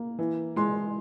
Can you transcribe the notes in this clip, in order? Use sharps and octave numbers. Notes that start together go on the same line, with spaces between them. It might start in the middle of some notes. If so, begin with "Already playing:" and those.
Already playing: A#3
E3
G#3 C6